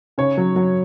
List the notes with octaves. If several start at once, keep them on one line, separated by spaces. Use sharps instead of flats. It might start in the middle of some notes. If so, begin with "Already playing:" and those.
C#3 C#5
F#3
F#3